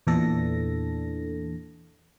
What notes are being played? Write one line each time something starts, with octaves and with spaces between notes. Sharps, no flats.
E2 A#2 E3 D4 A4 A#6